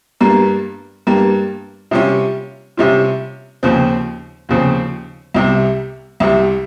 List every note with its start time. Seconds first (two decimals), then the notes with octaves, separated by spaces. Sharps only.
0.21 G2 G3 A#3
1.07 G2 G3 A#3
1.91 C3 G3 C#4 F4
2.77 C3 G3 C#4 F4
3.63 D#2 C#3 F3 C4
4.49 D#2 C#3 F3 C4
5.34 C2 C3 G3
6.20 C2 C3 G3